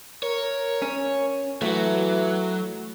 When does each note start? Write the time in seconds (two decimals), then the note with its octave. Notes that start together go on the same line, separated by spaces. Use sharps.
0.23 A#4 C#5
0.82 C#4
1.62 E3 F#3 A3 F#4